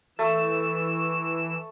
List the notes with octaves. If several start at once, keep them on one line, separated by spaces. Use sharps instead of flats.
E3 A3 E6